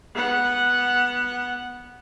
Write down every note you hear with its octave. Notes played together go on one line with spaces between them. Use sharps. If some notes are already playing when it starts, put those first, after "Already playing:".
B3 F#5